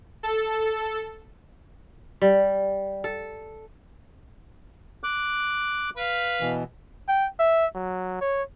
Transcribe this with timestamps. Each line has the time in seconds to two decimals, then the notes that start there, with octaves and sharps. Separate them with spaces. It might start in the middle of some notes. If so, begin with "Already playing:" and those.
0.23 A4
2.22 G3
3.04 A4
5.04 D6 F#6
5.97 B4 F5
6.41 B2 E3
7.08 G5
7.39 E5
7.75 F#3
8.21 C#5